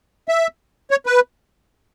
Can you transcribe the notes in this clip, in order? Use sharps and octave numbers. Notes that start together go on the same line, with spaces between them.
E5
C#5
B4